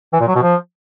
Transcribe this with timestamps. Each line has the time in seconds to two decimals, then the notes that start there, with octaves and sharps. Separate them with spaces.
0.13 E3
0.20 A#2
0.28 F#3
0.35 B2
0.43 F3